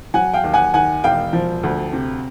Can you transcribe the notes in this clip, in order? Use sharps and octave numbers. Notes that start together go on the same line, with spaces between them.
F#3 F#5 G#5
F5 G5
D#2
F#5 G#5
D#3 F#5 G#5
E1 F5 G5
F3
D2
C3